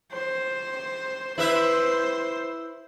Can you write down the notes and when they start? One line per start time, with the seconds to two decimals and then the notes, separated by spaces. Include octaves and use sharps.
0.12 C5
1.38 E4 B4 C5 E5